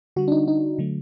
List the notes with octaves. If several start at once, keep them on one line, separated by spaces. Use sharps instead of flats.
D3 G3 F#4
D4
D#4
D#4
D3 F#3 A3